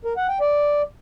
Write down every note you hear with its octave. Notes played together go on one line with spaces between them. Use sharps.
A#4
F#5
G5
D5